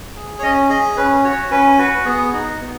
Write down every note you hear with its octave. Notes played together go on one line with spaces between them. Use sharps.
G#4
C#5
C#4 D#5
G#4 D#5
C#4 B4
F#4 C#5
C#4 B4
F#4 B4
B3 G#4
D#4 F#4
B3